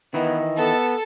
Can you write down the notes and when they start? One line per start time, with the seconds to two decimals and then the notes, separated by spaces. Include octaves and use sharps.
0.14 D#3 E3 B3 E4 D#5
0.58 B3 A4